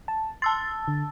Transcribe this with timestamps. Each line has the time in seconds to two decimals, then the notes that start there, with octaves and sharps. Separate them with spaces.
0.08 A5
0.42 A5 C6 E6 A6
0.88 D3